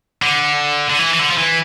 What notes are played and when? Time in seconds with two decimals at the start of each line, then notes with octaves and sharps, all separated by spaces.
0.22 D3
0.90 D3
0.99 E3
1.14 E3
1.19 D3
1.30 F3
1.38 E3